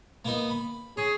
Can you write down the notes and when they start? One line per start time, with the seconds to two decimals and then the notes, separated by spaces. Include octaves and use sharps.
0.25 A#3 B3 D#4
0.50 B5
0.97 C#4 G#4